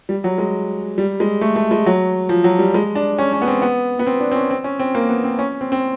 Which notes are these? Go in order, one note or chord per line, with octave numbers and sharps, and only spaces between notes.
G3
F#3
G#3
G3
G#3
A3
A3
G#3
F#3
F3
F#3
G3
G#3
D4
C#4
C#4
B3
C4
B3
B3
C4
D4
C4
C#4
C4
C#4
C4
A#3
B3
C4
C#4
C4
C4